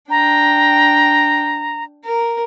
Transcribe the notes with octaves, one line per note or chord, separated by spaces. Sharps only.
D4 G5 A#5
A#4